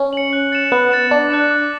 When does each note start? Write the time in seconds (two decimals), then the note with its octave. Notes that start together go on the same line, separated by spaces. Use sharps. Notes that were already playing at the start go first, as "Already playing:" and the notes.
Already playing: C#4
0.13 C#7 F#7
0.33 F#6
0.52 A6 C#7 E7
0.72 B3 F#6
0.91 A6 C#7 E7
1.11 D4 D6
1.31 F#6 C#7 E7
1.51 D6